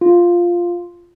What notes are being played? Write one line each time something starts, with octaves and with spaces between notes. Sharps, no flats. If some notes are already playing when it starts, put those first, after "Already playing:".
F4